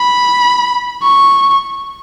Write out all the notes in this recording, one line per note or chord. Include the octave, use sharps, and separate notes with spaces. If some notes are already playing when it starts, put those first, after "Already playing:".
Already playing: B5
C#6